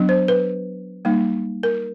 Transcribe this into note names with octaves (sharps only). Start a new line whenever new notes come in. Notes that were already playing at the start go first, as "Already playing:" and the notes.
Already playing: F#3 B3 D4
C5
B4
G3 A#3 D#4
A#4